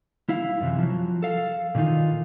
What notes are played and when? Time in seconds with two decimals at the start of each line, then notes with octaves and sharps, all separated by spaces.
0.29 E4 F5
0.60 F#2 C3 E3
0.79 F3 F#3
1.22 A4 F5
1.75 A#2 D#3 E3 D#4 F4